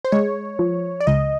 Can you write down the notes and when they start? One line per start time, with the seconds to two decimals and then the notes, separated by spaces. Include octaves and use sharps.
0.04 C5
0.12 G#3 C#5
0.59 F3
1.00 D5
1.07 C#2 D#5